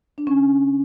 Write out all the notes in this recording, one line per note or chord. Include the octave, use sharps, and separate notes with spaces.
D4
C#3 C#4